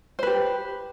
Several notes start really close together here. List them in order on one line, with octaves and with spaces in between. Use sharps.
C5 B4 G4